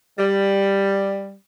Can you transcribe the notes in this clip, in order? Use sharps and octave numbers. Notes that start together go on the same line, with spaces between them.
G3